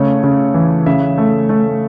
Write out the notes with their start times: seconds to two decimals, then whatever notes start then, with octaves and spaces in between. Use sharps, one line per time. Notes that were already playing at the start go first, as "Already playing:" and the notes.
Already playing: C#3 A3 C#5
0.24 C#3
0.54 E3
0.86 C#3 E5
1.18 A3
1.49 A3